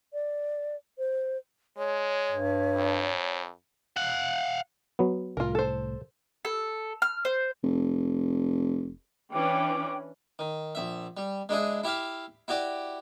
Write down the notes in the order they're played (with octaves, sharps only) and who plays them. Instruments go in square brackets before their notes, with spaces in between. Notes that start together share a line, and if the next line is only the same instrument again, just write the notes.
[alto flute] D5
C5
[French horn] G#3 [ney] C#5
[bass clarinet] G2
[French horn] F2
[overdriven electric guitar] F5 F#5
[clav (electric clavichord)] F#3 B3
[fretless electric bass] C2 A2 [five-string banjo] F4 A#4
[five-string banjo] A4 C5
[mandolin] A4
F6
C5
[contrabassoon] F1
[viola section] E3 C#4 D4 [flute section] G5 D6
[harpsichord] D#3
A#1 E5
G3
G#3 D4 E4 G#4
E4 G4 E5 F5
E4 F#4 G4 D5